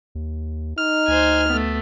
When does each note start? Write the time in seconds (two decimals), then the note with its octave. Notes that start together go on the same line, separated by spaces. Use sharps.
0.15 D#2
0.78 D#4 F6
1.08 D2 C5 G#5
1.49 A3 B3